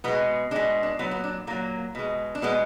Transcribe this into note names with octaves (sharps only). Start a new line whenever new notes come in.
B2 G#3 B3
B2 G#3 D4
D4
A#2 F#3 B3
B3
D4
A#2 F#3 A#3
B2 G#3
D4
B2 G#3 B3